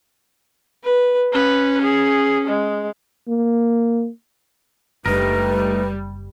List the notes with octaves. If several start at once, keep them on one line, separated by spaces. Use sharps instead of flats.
B4
C#4 B4
G#4
G#3
A#3
F#1 G3 A3 D4 D#4 A#4 B4